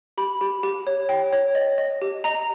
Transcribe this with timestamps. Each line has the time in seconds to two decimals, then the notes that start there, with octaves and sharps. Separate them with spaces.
0.18 G4 B5
0.41 G4
0.63 G4
0.87 C#5
1.09 G5
1.33 C#5
1.55 D#5
1.78 D#5
2.02 G4
2.24 D#5 A#5